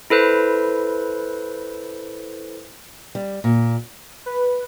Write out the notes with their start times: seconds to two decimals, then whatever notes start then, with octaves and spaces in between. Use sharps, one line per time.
0.10 E4 A4 B4 C5
3.15 G3
3.44 A#2
4.26 B4